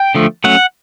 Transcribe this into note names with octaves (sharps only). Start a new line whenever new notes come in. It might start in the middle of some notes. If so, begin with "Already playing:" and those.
Already playing: G5
D3 F3 A3
F#3 A3 C#4 F#5